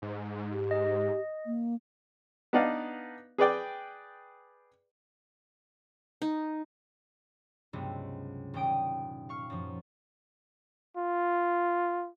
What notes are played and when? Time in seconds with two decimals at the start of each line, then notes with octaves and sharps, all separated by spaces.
0.02 G#2
0.51 G4
0.71 D#5
1.46 A#3
2.53 B3 D4 D#4 D5 F5 F#5
3.38 G#4 B4 D5 G5
6.22 D#4
7.73 C#2 G2 C3 F#3 G#3 B3
8.54 D#1 A#2 C#4 G5 D#6 D7
9.29 F5 C#6 F6
9.50 F#2 F3
10.97 F4